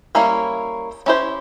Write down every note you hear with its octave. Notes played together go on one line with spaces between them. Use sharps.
G3 A#3 C#4 E4
C#4 E4 G4 C5